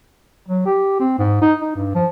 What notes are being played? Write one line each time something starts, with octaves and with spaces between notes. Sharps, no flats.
F#3
G4
C4
G#2
D#4
D#4
G2
F3